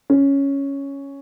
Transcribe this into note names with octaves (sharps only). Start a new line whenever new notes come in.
C#4